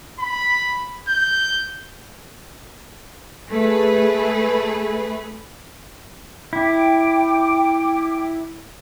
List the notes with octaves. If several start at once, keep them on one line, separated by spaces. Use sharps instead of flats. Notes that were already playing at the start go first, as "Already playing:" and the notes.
B5
G6
A3 G#4 B4
E4 G5 D6